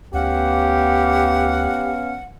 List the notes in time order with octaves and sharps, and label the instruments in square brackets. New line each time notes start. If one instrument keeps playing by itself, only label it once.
[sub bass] D2 [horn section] B3 C#4 F5 [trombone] G4 [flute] F#5